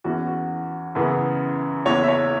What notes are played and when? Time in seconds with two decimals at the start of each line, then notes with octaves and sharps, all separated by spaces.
0.04 E2 E3 C#4 F#4
0.27 F#4
0.95 F#2 C#3 E3 B3
1.85 F#1 E2 E3 C#5
2.04 E5
2.08 C#5